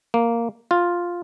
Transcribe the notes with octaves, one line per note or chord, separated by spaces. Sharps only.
A#3
F4